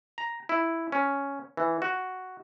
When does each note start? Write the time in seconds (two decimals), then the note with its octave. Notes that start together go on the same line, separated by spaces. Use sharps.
0.18 A#5
0.49 E4
0.92 C#4
1.57 E3
1.82 F#4